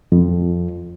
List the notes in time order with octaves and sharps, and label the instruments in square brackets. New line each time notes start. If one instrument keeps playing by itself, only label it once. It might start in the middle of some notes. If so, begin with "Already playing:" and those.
[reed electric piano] F2